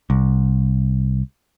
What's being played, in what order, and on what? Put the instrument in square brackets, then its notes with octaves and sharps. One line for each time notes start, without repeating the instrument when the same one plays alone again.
[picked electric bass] C2